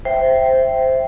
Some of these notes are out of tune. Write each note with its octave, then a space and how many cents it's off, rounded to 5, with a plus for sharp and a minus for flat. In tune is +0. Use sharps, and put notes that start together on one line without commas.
C5 +0 E5 +5 G5 -5